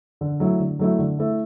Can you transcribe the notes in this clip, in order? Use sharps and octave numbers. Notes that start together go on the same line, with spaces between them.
D3
F#3 A3 E4
D3
F#3 A3 E4
D3
A3 E4